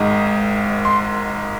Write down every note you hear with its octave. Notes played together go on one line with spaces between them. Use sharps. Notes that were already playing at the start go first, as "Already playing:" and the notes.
Already playing: G#1 G#2 D#3
C6